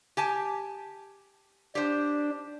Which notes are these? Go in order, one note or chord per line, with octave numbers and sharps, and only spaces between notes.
G4 G#5 A5
D4 G4 C5